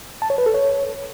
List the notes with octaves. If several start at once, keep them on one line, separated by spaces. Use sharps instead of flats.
A5
C#5
B4
A4
C#5